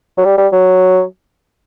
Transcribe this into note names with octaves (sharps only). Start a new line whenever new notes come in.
F#3
G3
G3
F#3